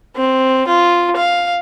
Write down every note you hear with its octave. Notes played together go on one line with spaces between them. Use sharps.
C4
F4
F5